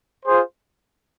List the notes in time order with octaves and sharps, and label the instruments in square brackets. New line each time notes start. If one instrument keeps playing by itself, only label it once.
[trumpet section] F4 G#4 C5